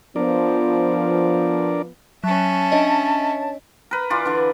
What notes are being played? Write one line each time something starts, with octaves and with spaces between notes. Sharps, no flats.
F3 B3 D4 A#4 D5
F#3 C#4 E5 A5
D4 C#5 D#5
A#4 B4
E3 F4 D5
D3 E3